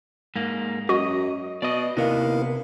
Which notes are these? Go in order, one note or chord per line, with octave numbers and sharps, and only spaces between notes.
G#2 A#3
F#2 F#4 D#5
B2 D5 D#5
D#2 C3 B3 E4 A#4 F5